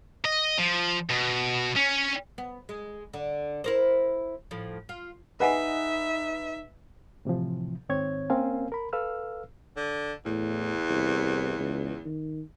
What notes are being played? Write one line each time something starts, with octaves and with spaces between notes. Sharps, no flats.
D#5
F3
B2
C#4
B3
G#3
D3
E4 A#4 C5
A2 F3
F4
D#4 G#4 B4 D#5 E5 F#5 G#5
A2 C3 E3 F3
G#2 D#3 C4 C#5 G#6
A#3 C4 C#4 A#4 F5 G#5
A#4 B5
A4 B4 F5 E6 F6
D3
E2 A2
C2
C#2
D#3